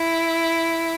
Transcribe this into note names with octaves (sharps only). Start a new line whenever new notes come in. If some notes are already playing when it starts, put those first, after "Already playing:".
Already playing: E4